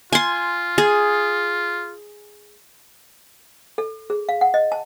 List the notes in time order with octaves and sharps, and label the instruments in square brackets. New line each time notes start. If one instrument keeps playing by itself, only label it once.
[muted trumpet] F4 [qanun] G#5 C6
[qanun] G#4
[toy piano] A4
G#4
F5
F#5
D#5
A5